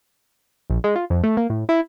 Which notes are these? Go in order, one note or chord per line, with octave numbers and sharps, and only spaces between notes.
A#1
G#3
F4
F2
A3
A#3
A2
E4